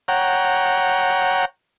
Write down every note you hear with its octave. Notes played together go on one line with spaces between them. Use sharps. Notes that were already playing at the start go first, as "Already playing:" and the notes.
C#5 F#5 G5 A#5